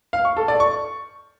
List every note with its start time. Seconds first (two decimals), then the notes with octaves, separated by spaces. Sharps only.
0.13 F5
0.25 C#6
0.37 A4
0.48 D5
0.60 C#6